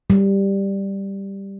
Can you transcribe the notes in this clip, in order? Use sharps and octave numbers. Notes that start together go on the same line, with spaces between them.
G3